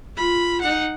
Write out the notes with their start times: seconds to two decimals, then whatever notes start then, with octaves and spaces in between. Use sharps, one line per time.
0.16 F4 B5
0.61 D#4 F#5